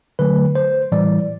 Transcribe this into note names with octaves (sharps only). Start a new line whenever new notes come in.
D3 F#3 A3 B4
C5
A2 E3 G3 D5